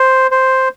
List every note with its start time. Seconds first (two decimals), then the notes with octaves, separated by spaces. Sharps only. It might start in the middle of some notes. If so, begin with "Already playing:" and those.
Already playing: C5
0.31 C5